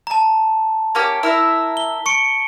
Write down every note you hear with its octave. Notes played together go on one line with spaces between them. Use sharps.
A5 A#5
A#3 C#4 G4
E4 A#4 E5
G7
C#6 C#7 D7